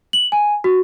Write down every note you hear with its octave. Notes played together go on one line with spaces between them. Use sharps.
F#7
G#5
F#4